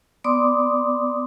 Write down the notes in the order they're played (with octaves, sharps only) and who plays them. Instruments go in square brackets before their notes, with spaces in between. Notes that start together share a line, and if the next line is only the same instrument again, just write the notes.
[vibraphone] B3 D5 C6 D6 D#6